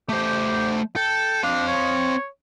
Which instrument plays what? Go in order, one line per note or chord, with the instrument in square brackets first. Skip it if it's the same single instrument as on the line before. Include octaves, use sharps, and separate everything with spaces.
[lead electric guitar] A3 C5 [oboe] G4
[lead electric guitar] A4 [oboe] G5
[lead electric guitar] C4 F5 [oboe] D4
[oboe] C#5